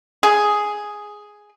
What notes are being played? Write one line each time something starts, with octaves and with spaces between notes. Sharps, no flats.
G#4